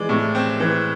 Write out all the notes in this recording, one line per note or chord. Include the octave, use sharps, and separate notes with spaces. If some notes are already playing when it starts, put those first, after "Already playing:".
Already playing: E3 G#3 D5
A2
C4
E3